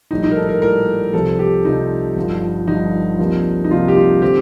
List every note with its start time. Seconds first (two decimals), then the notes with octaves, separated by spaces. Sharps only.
0.11 A#1 A2 G3 D#4
0.24 D#4
0.31 A#4
0.36 A4
0.49 A#4
0.61 A#1 A2 G3 A#4
1.13 C2 C3 F3 C4 A4
1.39 G4
1.65 C2 C3 F3 C4 D#4
2.16 G1 G2 F3
2.67 G1 G2 F3 D#4
3.19 C2 C3 F3 A#3
3.64 D#4
3.70 C2 C3 F3 A#3 F4
3.88 G4
3.97 F4
4.22 D3 A3 C4 G4